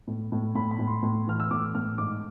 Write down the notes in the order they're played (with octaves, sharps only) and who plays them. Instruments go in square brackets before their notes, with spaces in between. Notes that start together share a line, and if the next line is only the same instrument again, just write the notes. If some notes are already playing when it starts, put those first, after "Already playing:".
[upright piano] A2
A2
A2 B5
B5
A2
C6
A2
E3 F6
E6
A2 D6
A2 F6
G#2 D6